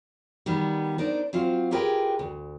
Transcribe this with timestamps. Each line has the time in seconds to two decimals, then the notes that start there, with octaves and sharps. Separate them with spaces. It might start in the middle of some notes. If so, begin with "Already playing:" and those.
0.46 D#3 G3 B3
0.98 D4 D#4 A#4 C5 D5
1.33 F#3 C4 F4 C5 F5
1.71 F4 G4 G#4 A#4 B4 G5
2.19 D2